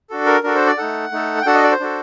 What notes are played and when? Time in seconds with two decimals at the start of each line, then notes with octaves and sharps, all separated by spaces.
0.10 D4 F#4 A4
0.26 A#4
0.43 D4 F#4 A4 A#4
0.55 C5
0.66 D5
0.78 A3 D#4 A4 F#5
1.12 A3 D#4 A4
1.42 G5
1.46 D4 F#4 A4 F#5
1.54 D#5
1.63 D5
1.72 C5
1.80 D4 F#4 A4